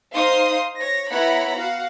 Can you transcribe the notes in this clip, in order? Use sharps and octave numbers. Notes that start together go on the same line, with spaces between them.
D#4 C5 F5 C6 D#6
C#5 A#6
B3 E4 C#5 F#5 A#5 B5
F#4 F5 F#5